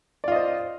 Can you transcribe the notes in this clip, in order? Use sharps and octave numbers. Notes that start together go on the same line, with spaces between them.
F4 C5 D5 D#5